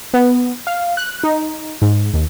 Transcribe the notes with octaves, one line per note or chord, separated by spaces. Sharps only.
B3
F5
F#6
D#4
G#2
D#2